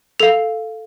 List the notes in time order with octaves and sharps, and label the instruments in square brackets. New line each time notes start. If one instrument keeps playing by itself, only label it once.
[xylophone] A4 F5 F7